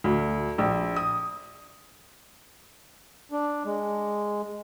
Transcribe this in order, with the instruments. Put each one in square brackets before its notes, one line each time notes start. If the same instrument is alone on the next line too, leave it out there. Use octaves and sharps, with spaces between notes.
[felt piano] D2
A#1
D#6
[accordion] D4
G#3